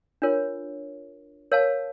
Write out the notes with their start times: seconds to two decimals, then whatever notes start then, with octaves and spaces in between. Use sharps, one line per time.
0.22 D4 F4 A#4 C#5
1.52 A#4 C#5 F5 A5